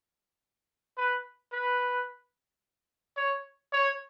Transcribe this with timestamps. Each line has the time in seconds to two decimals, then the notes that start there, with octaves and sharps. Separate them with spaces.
0.97 B4
1.52 B4
3.17 C#5
3.73 C#5